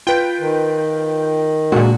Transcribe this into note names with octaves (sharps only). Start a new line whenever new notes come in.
F4 B4 G5 D7
D#3
A#2 D3 G#3 F#4